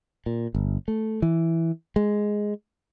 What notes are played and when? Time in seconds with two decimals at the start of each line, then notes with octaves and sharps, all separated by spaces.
0.26 A#2
0.55 G1
0.88 A3
1.22 E3
1.96 G#3